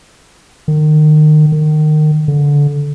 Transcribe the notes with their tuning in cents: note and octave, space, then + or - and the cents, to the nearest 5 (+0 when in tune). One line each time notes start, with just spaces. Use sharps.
D#3 -30
D#3 -25
D3 -20